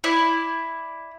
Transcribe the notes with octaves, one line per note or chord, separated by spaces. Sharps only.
E4 D5